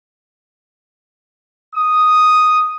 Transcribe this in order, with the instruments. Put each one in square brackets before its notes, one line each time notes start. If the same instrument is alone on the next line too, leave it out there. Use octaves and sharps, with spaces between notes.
[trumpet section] D#6